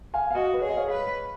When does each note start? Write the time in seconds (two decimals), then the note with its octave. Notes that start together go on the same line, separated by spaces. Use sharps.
0.14 F5 G#5
0.31 F5
0.34 F#4 D#5 F#5
0.53 B4
0.61 G#4 C#5
0.69 D#5
0.77 C#5 F5
0.92 B4